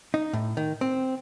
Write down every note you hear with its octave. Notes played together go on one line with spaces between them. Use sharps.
D#4
A2
D#3
C4